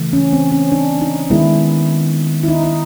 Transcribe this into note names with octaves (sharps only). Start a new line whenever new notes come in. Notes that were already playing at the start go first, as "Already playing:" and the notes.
Already playing: C#3 E3 A3
C#4
C4
C#4
D4
D#4
D#3 G#3 B3 E4
E4
D#4
D#4